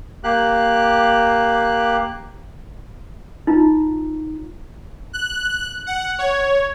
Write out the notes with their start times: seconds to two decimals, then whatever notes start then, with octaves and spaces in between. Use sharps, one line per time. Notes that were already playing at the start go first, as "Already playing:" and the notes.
0.24 A#3 G4 F#6
3.47 D#4 F4 A#5
5.13 F#6
5.87 F#5
6.19 C#5